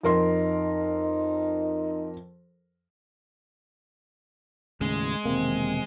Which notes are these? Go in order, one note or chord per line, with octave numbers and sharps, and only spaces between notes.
F2 D#4 A#4 C6
D#2 A2 C#3 G#3
E1 C3 D#3 A#3 C4